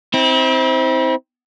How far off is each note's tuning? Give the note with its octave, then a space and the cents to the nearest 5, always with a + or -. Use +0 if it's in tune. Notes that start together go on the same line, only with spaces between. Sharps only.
C4 +0 E4 -40